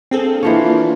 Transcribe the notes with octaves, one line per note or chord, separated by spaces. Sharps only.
A#3 C4 D4 F4 G#4 A4
E3 F3 C#5